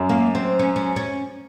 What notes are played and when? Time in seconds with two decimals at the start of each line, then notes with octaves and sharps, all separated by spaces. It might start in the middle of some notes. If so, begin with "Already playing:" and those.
Already playing: F#2 F#3
0.09 A#3
0.35 C4
0.59 C#4
0.76 C#4
0.96 C#4